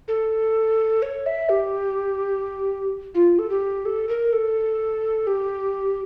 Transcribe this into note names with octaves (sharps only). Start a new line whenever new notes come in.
A4
C#5
E5
G4
F4
A4
G4
A4
A#4
A4
G4